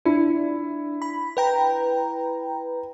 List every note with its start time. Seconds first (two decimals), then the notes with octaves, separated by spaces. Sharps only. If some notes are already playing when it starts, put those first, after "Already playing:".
0.05 D4 E4
1.02 B5
1.37 B4 G5 A#5